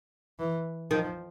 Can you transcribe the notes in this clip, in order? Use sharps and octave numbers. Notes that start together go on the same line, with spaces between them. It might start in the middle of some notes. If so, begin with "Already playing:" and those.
E3
D#3 F3